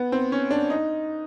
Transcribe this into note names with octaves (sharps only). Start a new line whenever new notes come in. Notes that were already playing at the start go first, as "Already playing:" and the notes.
Already playing: B3
C4
C#4
D4
D#4